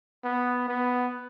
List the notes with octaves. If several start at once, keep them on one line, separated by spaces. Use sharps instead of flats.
B3
B3